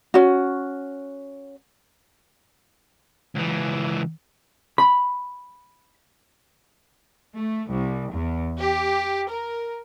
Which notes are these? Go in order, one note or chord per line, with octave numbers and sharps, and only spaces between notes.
C#4 F#4
C#2 E3
B5
A3
C2
E2
G4
A#4